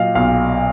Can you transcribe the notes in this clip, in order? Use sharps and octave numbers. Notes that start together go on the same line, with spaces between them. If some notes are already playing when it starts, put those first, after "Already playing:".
Already playing: A#2 F#3 D#5 F5
B1 F5